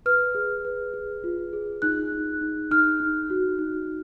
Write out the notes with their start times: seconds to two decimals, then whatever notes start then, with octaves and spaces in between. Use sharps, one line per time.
0.06 B4 F6
0.35 G#4
0.65 B4
0.94 G#4
1.24 F4
1.53 G#4
1.82 D#4 F#6
2.12 D#4
2.41 D#4
2.71 D#4 F6
3.00 D#4
3.30 F#4
3.59 D#4